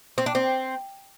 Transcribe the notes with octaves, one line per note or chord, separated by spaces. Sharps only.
C4
D4
C4